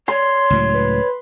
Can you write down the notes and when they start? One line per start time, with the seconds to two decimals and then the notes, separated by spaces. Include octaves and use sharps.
0.08 C#5 C6
0.50 C#2 A2 F#3
0.73 B4